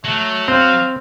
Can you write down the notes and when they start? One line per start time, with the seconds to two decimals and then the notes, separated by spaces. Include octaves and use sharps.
0.04 F#3 A3
0.48 C4 F5